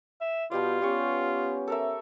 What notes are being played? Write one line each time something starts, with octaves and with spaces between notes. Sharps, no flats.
E5
B2 G3 F4 G4 D5
B3 C#4 G4 C#6
A4 A#4 E5